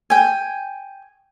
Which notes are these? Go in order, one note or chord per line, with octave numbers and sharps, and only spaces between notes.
G5 G#5